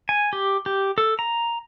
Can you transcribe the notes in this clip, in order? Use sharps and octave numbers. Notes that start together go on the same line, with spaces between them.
G#5
G4
G4
A4
A#5